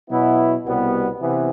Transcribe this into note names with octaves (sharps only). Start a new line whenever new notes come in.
B2 F#3 B3 E4
C2 B2 G3 B3
C3 E3 B3